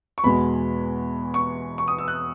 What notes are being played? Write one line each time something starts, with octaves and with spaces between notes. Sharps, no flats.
C#6
E2 B2 G#3 B5
C#6
C#6
D#6
E6
F#6